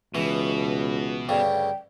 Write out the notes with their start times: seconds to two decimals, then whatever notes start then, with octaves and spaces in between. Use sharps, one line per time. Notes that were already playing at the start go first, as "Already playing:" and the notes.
0.15 C#2 B2 E3
1.29 D2 G2 C#3 G5